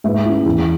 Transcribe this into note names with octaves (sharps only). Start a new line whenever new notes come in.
G#2 B4 E5
G#3 C#4 E4
E2